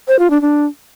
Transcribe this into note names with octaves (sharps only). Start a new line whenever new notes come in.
C5
F4
D4
D4